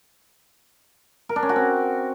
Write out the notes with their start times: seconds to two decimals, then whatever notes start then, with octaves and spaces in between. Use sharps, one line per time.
1.29 A#4
1.36 D4
1.43 C#4
1.49 F#4
1.56 C4